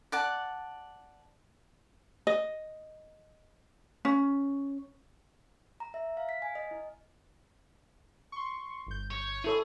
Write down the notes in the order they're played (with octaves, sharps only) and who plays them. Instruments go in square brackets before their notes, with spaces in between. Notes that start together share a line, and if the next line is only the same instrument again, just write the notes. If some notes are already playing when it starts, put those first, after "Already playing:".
[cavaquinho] D5 F#5 A5
[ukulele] D#5
C#4
[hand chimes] A#5
E5
F5
B6
G#5
D#5
E4
[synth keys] C6 C#6
G1 G6
[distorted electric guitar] C#5
[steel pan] E4 A4 C#5 [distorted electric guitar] G#4